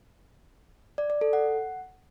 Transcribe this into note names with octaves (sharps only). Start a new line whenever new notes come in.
D5
D5
A4
F#5